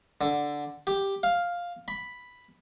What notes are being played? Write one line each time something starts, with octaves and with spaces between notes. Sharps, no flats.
D3
G4
F5
B5